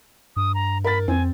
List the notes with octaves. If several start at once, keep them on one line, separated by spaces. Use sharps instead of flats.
G2 D#6
A#5
A#4 B5 A6
F2 C4 G#5